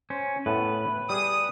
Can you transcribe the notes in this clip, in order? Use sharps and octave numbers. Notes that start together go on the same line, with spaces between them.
C#4 C5
A2 B3 B4 A5
G3 G#4 D#6